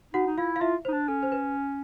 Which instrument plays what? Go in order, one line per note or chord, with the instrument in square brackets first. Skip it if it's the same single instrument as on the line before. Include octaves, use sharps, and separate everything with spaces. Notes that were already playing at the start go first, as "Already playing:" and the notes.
[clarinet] D#4 [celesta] F#4 F#5
[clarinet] D#4
[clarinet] E4 [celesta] F4 F5
[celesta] F5
[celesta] E4 E5 [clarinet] F4
[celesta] C5
[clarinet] D#4
D4
[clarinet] C#4 [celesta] A4
[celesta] C5
B4